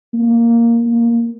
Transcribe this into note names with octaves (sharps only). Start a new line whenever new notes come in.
A#3
A#3